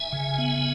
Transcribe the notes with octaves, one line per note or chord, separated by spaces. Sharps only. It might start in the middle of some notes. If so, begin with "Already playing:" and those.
Already playing: E5 G#5
C#3
B3